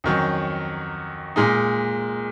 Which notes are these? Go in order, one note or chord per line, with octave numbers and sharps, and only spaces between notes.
F2 D#3 F#3 C#4
A#2 G#3 D#4